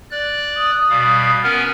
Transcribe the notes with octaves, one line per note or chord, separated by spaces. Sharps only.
D5 F#6
D#6
B2 G3 F5
B3 C#4 A#4 F6